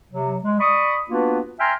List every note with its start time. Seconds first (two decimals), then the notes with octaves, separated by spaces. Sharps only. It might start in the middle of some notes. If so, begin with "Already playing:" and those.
0.12 C3 F#3
0.44 G#3
0.60 D5 B5 C#6 D#6
1.10 A#3 B3 D4 F4 F#4 B4
1.60 E5 G5 G#5 A#5 C6 F6